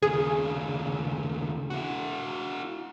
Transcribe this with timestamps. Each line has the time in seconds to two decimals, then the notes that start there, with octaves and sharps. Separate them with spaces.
0.02 D#2 C#3 G#4
1.70 E4 F#4